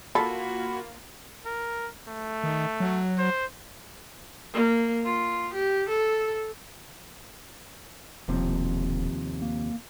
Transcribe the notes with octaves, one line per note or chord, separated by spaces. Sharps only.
A#3 F4 F#4 A4 B5
A#4
A3
D#3
F#3
C5
A#3
F4
G4
A4
E1 D#2 C3 F3
A#3